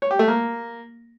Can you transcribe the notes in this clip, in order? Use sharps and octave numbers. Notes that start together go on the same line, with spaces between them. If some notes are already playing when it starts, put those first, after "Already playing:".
C#5
G4
A3
A#3